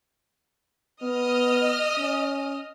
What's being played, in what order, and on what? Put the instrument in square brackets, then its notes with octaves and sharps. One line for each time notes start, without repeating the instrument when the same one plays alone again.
[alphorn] B3 [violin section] D#5 D#6 F6
[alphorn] C#4